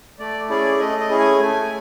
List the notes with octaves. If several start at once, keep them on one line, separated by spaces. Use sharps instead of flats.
A3 D5
C#4 E4 G#4 D5
A3 D#5
D#5
C#4 E4 G#4
G#5
A3